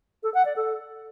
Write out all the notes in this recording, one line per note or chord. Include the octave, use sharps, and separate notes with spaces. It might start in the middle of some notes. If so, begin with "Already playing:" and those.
A4
F#5
D5
A4